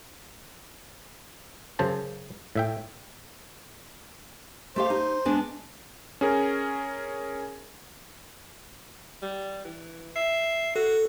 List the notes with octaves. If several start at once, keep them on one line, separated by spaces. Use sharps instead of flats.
F#2 C#3 C5 A5
A2 E5 G5
A3 G4 C5 F5
D#4
G#3 B3 D4
C#4 G#4 A#4
G3
E3
E5 C7
F#4 A4